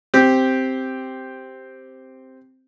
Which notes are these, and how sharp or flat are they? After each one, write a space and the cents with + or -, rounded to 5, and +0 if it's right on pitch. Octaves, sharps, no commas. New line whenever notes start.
C4 +0 G4 +0